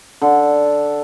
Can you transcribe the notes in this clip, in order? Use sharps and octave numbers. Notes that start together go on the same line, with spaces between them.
D3 A4